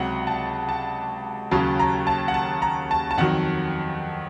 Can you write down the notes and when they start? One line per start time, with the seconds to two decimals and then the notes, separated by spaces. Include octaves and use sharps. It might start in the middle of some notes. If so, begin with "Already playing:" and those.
Already playing: C#2 C3 F#3 F#5
0.27 A5
0.69 A5
1.51 D#2 C#3 F#3 A5
1.79 A#5
2.07 A5
2.28 F#5
2.34 A5
2.62 A#5
2.91 A5
3.11 A5
3.18 F2 D#3 F#3 F#5